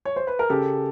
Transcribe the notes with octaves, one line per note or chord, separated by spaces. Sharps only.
C#5
C5
B4
A#4
C#3 G4 A4